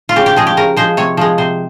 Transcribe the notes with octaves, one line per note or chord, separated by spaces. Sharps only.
F4
C#3 G4
G4
F3 G#3 G#4
G4
C#3 A#4
F3 G#3 C5
C3 C#5
F3 G#3
C3 C5